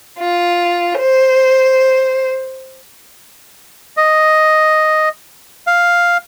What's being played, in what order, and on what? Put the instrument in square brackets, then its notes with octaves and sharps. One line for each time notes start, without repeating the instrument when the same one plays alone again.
[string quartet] F4
C5
[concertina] D#5
F5